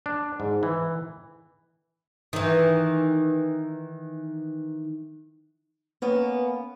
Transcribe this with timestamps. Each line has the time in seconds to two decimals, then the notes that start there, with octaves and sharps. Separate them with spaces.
0.06 D4
0.40 G#2
0.63 E3
2.33 D#3 E3
6.02 A#3 B3 C#4